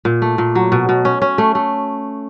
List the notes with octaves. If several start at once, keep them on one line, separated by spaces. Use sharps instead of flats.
A#2
A3
A#2
F#3
B2
B2
C#4
C#4
A3
A3